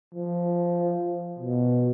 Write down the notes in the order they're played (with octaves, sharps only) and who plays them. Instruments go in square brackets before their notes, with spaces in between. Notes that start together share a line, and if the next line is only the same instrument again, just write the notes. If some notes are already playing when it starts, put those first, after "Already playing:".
[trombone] F3
B2